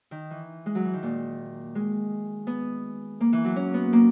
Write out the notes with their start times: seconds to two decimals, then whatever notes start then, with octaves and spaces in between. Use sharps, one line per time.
0.11 D#3
0.31 E3
0.66 G#3
0.75 F#3
0.85 E3
0.93 D#3
1.03 A#2
1.75 G#3
2.47 B3
3.21 A#3
3.33 E3
3.44 F#3
3.56 C#4
3.74 B3
3.93 A#3